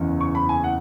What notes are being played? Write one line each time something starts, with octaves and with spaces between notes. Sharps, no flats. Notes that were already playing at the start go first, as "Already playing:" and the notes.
Already playing: F#1 E2 C#3 E3
C#6
B5
G#5
F#5